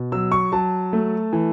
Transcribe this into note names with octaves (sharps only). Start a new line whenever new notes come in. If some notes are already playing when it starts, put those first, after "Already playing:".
Already playing: B2
F#3 E6
C#6
F#3 A5
A3
E3